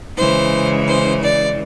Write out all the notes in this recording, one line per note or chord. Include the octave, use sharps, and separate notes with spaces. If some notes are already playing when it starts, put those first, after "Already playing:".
C#3 E3 G#3 C5
C5
D5